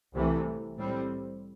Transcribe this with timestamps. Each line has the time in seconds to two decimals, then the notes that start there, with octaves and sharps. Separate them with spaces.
0.14 C2 C3 E3 A3
0.77 A2 G3 C4